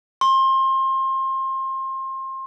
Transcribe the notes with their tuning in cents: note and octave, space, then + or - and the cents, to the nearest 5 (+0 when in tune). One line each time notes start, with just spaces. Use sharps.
C6 +30